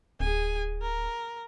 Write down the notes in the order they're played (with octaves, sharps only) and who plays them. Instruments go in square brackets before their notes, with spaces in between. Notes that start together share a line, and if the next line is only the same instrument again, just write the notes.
[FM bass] D1 [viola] G#4 G#5
[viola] A#4